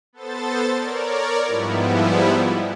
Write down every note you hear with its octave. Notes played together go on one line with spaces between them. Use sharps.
B3 A4 C5 A6
A#4 C#5 D5
G#2 F3 G3 B3 E4